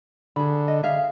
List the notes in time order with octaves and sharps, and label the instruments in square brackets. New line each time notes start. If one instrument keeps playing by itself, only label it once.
[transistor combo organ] D3 [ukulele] G#4 B5
[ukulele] D#5
G#4 E5 F5